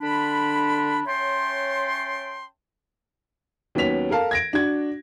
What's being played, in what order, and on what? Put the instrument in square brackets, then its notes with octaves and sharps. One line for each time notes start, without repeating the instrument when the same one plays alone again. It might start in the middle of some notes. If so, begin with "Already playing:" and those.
[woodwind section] D3 D4 B5
C#4 C#5 E5 G5 A5 C6
[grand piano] D#2 F#3 B3 C#4 B6 F7
A4 A#4 F5 A5
G#6 A#6 D7
D4 F#4 G#6